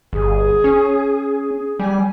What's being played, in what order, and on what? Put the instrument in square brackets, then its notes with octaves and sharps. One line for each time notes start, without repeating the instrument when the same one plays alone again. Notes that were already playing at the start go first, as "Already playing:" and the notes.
[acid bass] G1 [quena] G#4
[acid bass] C#4
[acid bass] G3 [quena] G#5